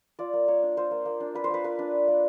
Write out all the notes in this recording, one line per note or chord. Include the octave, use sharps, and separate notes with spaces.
F4 D5
A#3
A#3 C#5
D4
F4 C5
A#3
A#3
D4
F4 B4
C5
A#3 B4
A#3 B4
D4
F4
A#3